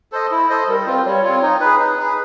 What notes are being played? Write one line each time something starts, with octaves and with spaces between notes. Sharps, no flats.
A4 C5 D#5
E4
A4 C5 D#5
G3 A#4
C4 F4 B4
G3 C#5
C4 F4
D#4
G#4 B4
D#4
G#4 B4